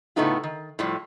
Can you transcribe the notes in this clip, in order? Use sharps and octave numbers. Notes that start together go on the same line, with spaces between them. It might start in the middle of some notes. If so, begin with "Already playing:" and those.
A2 C#3 A3 B3 D#4 F4
D#3
A2 F3 G3